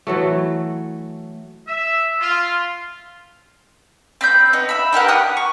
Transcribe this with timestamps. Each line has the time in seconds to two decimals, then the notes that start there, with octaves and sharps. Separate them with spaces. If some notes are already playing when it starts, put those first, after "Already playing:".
0.07 E3 F#3 A3
1.68 E5
2.21 F4
4.21 C4 B5 G6
4.53 B3 D#4
4.69 E5 B5
4.92 D#4 G4 A#4 F#5
5.08 G4 F#5 D#6 F#6
5.37 C#6